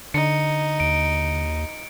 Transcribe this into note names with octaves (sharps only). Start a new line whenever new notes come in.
D3 D#4 C#7
D#2 D7